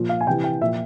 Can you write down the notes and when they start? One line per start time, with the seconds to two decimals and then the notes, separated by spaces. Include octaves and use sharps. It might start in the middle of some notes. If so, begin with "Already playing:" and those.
Already playing: A#2 F3
0.09 F5
0.21 G#5
0.27 C3 E3 G5
0.44 G5
0.61 A#2 F3 E5